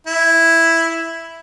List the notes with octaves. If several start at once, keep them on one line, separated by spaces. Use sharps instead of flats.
E4